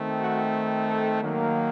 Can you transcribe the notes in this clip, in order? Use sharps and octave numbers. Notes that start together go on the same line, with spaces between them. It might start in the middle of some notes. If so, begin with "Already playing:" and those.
Already playing: D#3 A3 C4
F#4
A4
D#3 F#3 A#3